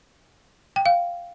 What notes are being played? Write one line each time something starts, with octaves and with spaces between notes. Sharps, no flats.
G5
F5